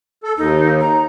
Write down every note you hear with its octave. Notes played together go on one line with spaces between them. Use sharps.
A4
D#2 D#4
A#5